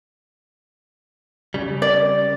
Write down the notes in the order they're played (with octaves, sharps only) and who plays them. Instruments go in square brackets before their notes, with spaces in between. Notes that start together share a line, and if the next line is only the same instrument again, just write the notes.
[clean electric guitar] C#3 G3
[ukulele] D5